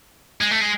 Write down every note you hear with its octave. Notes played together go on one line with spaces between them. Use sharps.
G#3
A3
G#3